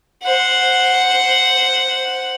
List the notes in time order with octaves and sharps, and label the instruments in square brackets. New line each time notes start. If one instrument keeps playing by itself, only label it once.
[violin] C5 F#5